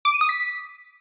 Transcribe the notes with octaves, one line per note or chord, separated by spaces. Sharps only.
D6
D#7
D#6
B6